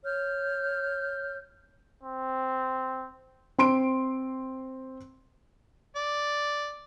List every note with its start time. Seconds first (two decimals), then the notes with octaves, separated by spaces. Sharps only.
0.04 C#5 F6 G6
2.03 C4
3.58 C4 C6 D7
5.96 D5